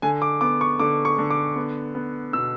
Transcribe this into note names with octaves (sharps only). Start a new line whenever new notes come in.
D3 G#5
D6
B3 D6
C#6
D3 D6
C#6
D3
D6
B3
B3
B2 E6